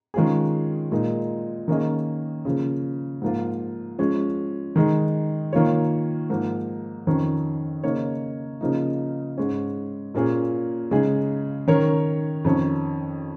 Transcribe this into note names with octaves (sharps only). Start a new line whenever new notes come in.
D#3 G#3 C#4 F4 G#4
A#2 G#3 D#4 A#4
D#3 A#3 C#4 G#4 D#5
C#3 F3 A#3
G#2 F3 A#3 F4
F3 G#3 C#4
D#3 G#3 D#4
D#3 A#3 F4 C#5
G#2 F3 A#3
F2 D#3 C#4
C#3 A#3 D#4 C#5
C#3 F3 A#3 D#4
G#2 G#3 C#4
A#2 A#3 C#4 F4 G#4
C#3 G#3 D#4 G#4
D#3 C#4 A#4 C#5
F2 D#3 C#4